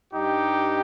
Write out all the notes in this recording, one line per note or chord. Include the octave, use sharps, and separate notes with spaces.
G2 G3 D#4 G4